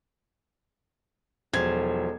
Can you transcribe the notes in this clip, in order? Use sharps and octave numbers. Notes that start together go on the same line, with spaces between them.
E1 F3 F#3 D#4 A4 G#6